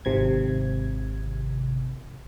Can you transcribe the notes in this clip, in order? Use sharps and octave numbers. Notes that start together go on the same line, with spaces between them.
G#1 C3 G#6